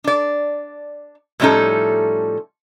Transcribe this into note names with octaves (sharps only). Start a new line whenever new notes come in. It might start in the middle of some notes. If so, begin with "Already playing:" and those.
D4 D5
A2 F3 G3 C#4 D#4 A4